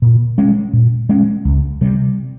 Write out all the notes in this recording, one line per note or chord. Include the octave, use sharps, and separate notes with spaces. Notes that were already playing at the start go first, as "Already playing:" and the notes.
A#2
G#3 C#4
A#2
G#3 C#4
C#2
C3 G3